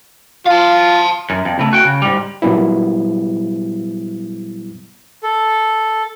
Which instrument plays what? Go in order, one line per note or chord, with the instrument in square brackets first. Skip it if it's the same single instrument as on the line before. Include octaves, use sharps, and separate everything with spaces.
[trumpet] F4 [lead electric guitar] F5 A5
[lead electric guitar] F#2
F2
C#3 A3
F#4 G5
C#3
G#2 G3
[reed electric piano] A#2 F#3 G3 B3 E4
[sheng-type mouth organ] A4